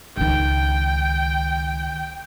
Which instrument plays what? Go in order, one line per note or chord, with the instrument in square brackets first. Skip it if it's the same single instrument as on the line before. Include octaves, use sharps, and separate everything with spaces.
[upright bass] C#2 D#3 [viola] G5